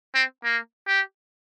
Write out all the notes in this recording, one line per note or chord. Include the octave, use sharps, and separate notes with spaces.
C4
A#3
G4